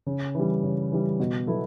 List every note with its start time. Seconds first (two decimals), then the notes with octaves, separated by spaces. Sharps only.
0.06 C#3
0.35 E3 G3
0.63 C#3
0.92 E3 G3
1.20 B2
1.47 F#3 B3 E4 A4